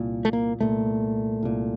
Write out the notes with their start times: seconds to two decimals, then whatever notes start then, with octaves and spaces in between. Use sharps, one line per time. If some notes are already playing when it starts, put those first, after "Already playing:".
Already playing: C2 A#2
0.25 A3
0.33 A#3
0.60 C2 A#2 A3
1.43 C2 A#2